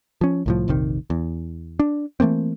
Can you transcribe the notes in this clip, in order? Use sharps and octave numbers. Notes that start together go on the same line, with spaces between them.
F3 C#4
C2 A2 F3
F1 A#1 C3 D#3
E2
D4
E3 A3 A#3 C4